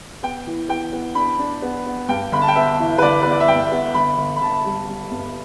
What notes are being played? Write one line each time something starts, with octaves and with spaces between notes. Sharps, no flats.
B3 G5
E3
B3 G5
B3
D4 B5
D4
B3
B3
G2 G5
G1 B5
A5
G5
B3 E5
E3
B4
G1 D5
B3 B4
D5
E5
G2 G5
B3
G1 B5
G1
B5
G1 A5
G3
G3
G2